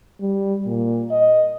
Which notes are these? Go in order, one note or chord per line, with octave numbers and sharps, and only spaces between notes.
G3
A#2
D#5